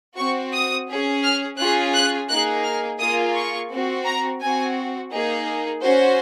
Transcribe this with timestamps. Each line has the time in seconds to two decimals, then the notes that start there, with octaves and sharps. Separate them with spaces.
0.16 C4 F#4 C#6
0.52 D#6
0.87 C#4 G#4
1.23 F6
1.58 C#4 F4 G#4 F#6
1.94 F#6
2.29 A#3 D#4 G#4 F#6
2.64 F6
2.99 A#3 F4 G#4 D#6
3.35 C#6
3.70 C4 F#4
4.06 A#5
4.41 C4 F#4 G#5
5.12 A#3 D#4 G#4
5.82 C#4 F#4 C5